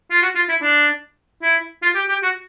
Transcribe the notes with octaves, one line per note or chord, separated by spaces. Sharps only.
F4
F#4
F4
E4
D4
E4
F4
G4
G4
F#4